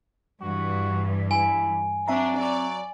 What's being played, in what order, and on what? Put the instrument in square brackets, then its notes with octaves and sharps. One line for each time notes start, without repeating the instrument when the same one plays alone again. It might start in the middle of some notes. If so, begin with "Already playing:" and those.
[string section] G2 E3 [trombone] F#4
[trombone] E4 [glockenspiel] G#5
[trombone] F#3 [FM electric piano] C4 E5 A#5 [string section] D4
[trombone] F#3 [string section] D5